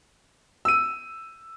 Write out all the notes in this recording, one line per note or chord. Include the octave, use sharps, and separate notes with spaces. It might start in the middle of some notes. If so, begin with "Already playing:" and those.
E6 D#7